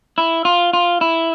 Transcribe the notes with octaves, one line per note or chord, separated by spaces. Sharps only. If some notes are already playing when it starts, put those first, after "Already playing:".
E4
F4
F4
E4